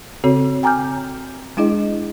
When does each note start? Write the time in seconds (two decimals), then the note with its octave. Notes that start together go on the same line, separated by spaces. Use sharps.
0.24 C#3 C4 F#4 A4 C#5
0.63 G5 G#5 A#5 D6 F6 G6
1.57 G#3 D4 E4 G#4 D#5